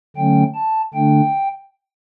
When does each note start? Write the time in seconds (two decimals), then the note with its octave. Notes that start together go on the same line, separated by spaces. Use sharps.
0.17 D3 F#3 A3 C#4 G5
0.55 A5
0.94 D3 A3 D4 G5